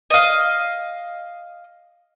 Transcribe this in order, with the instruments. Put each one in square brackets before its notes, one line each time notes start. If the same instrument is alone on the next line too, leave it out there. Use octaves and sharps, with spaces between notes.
[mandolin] D#5 F5